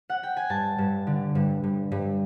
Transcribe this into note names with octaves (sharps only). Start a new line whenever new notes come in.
F#5
G5
G#5
G2 A5
G2
D3
G2
G2
G2